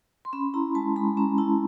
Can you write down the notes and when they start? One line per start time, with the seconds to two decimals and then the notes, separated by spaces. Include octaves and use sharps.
0.25 C6
0.33 C#4 B5
0.54 E4 A#5
0.75 G#3 A5
0.96 G#3 B5
1.17 C#4 A#5
1.38 E4 A5